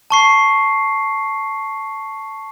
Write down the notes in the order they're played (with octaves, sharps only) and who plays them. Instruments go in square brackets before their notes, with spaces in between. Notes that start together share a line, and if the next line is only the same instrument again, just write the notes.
[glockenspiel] A5 C#6 C7